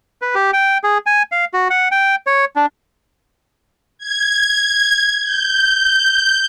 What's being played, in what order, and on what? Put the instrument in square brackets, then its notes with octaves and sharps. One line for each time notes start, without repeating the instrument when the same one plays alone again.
[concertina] B4
G4
G5
G#4
G#5
F5
F#4
F#5
G5
C#5
D4
[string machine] G#6
G6